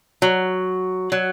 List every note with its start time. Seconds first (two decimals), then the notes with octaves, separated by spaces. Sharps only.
0.22 F#3
1.12 F#3